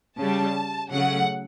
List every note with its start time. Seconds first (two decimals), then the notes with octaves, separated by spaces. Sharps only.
0.18 C#3 G3 A5
0.90 C#3 F#3 A3 F#5